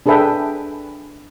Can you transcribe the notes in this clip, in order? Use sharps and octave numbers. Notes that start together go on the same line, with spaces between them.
D4 G#4 A4 B4 E5 G5